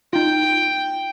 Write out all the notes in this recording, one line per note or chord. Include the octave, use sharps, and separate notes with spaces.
D#4 F4 G5